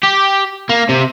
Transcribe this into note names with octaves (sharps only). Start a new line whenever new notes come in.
G4
A#3
C3